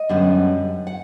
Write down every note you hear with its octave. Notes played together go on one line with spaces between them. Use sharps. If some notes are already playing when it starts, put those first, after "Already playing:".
Already playing: D#5
F#2 D3 G3 B3 D4
F#5